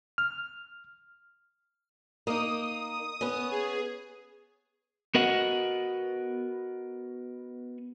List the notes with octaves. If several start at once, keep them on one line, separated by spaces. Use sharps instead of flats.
F6
A#3 D#4 D#6
B3 C#4
G#4
B3 F#4 A#4 B4 D#5 F#5